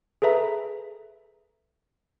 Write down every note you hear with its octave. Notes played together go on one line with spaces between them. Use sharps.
G#4 A4 B4 E5 A#5